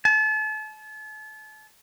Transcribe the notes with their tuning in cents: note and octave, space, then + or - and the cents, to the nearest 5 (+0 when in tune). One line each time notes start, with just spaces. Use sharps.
A5 -35